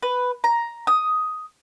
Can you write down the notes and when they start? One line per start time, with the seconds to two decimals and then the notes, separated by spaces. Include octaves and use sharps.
0.03 B4
0.44 A#5
0.87 D#6